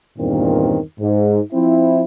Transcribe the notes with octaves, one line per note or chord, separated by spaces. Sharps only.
E2 G2 A#2 D#3 C4
G#2
F3 C4 E4